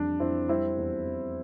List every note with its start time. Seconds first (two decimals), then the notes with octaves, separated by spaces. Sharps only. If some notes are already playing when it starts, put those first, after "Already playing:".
Already playing: F2 E3 G3 D4
0.20 F2 C4 E4
0.49 G3 C4 E4
0.78 E2
1.07 E2